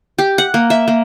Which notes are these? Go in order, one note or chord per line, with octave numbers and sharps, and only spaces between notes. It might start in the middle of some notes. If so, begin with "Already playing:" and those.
G4
F#5
A#3
E5
A#3